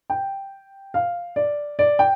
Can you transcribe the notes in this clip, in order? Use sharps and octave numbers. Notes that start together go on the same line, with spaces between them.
G5
F5
D5
D5
G5